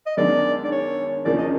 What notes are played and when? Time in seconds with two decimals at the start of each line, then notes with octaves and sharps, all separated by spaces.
0.06 D#5
0.17 F#2 D#3 G#3 B3 D4 D5
0.64 D5
0.72 C#5
1.25 E2 C#3 F3 A#3 D4 D5
1.39 D#5